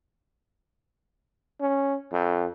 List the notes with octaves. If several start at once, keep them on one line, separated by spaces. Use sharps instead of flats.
C#4
F2